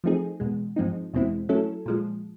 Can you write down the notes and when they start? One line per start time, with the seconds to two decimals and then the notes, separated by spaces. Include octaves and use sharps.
0.04 F3 A3 C4 D#4 G#4
0.40 E2 B2 G#3
0.76 G#2 F3 G#3 C4 D#4
1.14 E2 B2 G#3 C4 E4
1.49 F#3 A3 C#4 E4 A4
1.86 A#2 F3 G#3